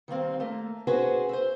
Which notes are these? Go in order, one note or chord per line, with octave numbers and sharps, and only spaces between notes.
D#3 G3 A#3 C4
A3 A#3
C#4 F#4 G#4 B4 C5
C5 E5